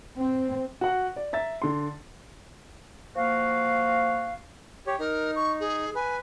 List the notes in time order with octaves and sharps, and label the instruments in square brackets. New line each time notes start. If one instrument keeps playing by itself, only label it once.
[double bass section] C4
[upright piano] F#4 F#5
D5
E5 A#5 A6
D3 C6
[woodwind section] F3 A#3 F#4 F5
[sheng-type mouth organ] G4 C#5
[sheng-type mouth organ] D#4 [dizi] A#4
[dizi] C#6
G#4
[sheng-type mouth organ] B4 [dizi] G#5